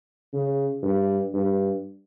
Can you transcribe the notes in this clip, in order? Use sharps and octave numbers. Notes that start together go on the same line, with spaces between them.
C#3
G2
G2